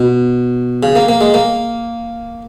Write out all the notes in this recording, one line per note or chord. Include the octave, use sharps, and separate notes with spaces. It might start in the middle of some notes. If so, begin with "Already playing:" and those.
Already playing: B2
C#3
A#3
A#3
G#3
A#3